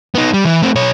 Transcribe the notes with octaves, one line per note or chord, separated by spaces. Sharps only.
B3 D#4
G3
E3
A3 C4
B1 C#5